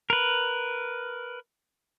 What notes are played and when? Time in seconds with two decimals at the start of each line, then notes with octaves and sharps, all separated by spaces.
0.10 A#4 B4